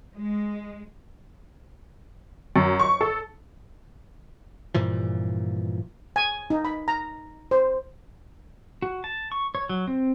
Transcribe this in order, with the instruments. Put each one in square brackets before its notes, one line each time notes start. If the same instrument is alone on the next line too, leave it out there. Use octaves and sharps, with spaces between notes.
[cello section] G#3
[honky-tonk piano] F#2
C#6
A4
[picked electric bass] G2 A#2 E3 F3
[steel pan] G#5
D#4
B5
A#5
C5
[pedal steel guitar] F#4
A5
C#6
C#5
F#3
C4